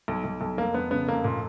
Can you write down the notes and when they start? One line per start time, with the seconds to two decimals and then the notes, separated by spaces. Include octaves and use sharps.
0.08 B1
0.24 B1
0.41 B1
0.58 F1 A#3
0.74 F1 B3
0.91 C#3 B3
1.08 F1 A#3
1.24 A#2